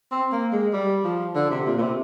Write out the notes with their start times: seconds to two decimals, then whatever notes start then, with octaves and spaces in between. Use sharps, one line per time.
0.11 C4
0.32 A#3
0.53 G#3
0.73 G3
1.04 F3
1.35 D3
1.50 C3
1.66 A#2
1.78 A#2
1.82 C3